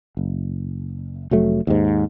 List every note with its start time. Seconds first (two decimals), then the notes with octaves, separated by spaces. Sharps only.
0.17 F#1
1.31 F1 F#3 A3
1.67 D#2 G#2